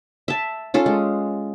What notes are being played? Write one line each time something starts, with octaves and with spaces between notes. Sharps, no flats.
E5 A5
C#4 F4 A4
G#3